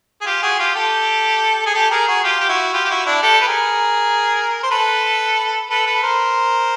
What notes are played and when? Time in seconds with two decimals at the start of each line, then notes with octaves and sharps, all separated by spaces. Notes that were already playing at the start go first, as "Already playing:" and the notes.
0.21 G#4
0.26 F4 G4
0.43 F#4 G#4
0.59 F4 G4
0.76 G4 A4
1.66 G#4
1.75 G4 A4
1.91 G#4 A#4
2.08 F#4 G#4
2.24 F4 G4
2.40 G4
2.48 E4 F#4
2.73 F4 G4
2.85 G4
2.90 E4 F#4
3.06 D4 E4
3.22 G4 A4
3.41 B4
3.48 G#4 A#4
4.63 C5
4.71 A4 B4
5.70 A4 B4
5.86 A4 B4
6.03 A#4 C5